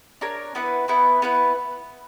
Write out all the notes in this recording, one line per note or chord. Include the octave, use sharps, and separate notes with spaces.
D4 A#4 C#5
B3 E4 B4 F#5
B3 E4 B4 F#5
B3 E4 B4 F#5